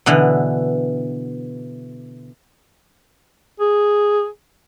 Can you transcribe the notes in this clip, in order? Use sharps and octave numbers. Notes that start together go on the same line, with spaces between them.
B2 D3 E3
G#4